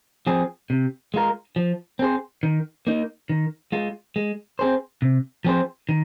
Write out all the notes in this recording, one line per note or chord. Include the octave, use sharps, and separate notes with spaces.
F3 C4 G#4
C3
G#3 F4 A#4
F3
C4 G#4 C5
D#3
A#3 D#4
D#3
G#3 F4
G#3
C4 G#4 C5
C3
F3 C4 G#4 C5
D#3